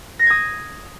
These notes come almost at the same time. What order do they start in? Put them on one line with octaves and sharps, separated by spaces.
A#6 C7 G#6 D#6